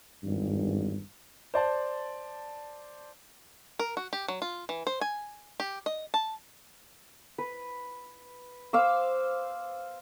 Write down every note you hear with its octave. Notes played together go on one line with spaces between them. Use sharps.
G#1 E2 G2
C5 D5 A5
A#4
F#4
G4
F#3
F4
E3
C5
G#5
G4
D#5
A5
B4
C5 F5 D6 E6